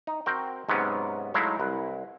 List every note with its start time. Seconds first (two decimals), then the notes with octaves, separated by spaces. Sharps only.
0.07 D#4
0.26 C4 F#4 A#4 G5
0.69 G#2 C3 F#3 B3 C#4
1.34 F#3 G#3 A3 D#4 E4 F5
1.60 C2 B4